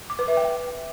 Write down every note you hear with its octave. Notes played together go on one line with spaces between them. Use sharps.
D6
B4
E5
G5